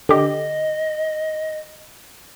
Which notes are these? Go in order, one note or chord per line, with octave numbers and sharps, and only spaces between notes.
D3 G4 D#5